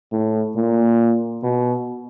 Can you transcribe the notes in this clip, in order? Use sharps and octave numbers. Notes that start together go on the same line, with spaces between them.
A2
A#2
B2